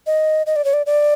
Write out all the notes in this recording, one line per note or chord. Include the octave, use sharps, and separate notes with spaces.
D#5
D#5
D5
C#5
D5
D5